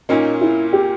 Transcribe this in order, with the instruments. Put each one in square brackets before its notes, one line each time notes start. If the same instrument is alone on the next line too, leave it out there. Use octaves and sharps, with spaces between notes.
[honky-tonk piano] A#2 A#3 C#4 [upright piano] D#4
[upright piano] E4
G4